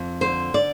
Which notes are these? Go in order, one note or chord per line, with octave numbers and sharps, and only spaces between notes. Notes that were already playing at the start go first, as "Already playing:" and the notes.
Already playing: F2
D3 C5
D5